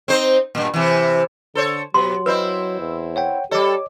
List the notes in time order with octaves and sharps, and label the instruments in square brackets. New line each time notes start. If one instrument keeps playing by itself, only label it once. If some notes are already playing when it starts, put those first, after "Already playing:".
[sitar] C4 D#4 C5
G2 A#2
C3 E3
[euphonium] D3 [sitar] A4 C5 C#5
[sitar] B2 B3 [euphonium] F#3 [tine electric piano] G4 [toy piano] C6
[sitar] C4 E4 C5 [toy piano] B4 D#5 [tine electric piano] E6
[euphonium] E2
[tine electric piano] C#5 F#5 G5
[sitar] G3 A4 [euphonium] G4 [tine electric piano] C#5 D6 [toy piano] D#5